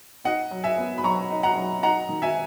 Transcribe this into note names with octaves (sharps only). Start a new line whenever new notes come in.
D#4 D#5 F#5
F#3
E5 G#5
B3
B5
F#3 A#5 C#6
D#4
F#5 A#5
F#3
D#4 F#5 A#5
D#3
E5 G#5